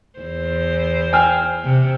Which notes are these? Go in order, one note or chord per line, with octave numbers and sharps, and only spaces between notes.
E2 C5
G5 G#5 F6
C3